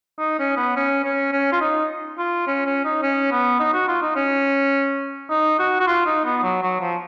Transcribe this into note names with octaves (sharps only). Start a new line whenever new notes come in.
D#4
C#4
B3
C#4
C#4
C#4
F4
D#4
F4
C#4
C#4
D#4
C#4
B3
D#4
F#4
F4
D#4
C#4
D#4
F#4
F#4
F4
D#4
B3
F#3
F#3
F3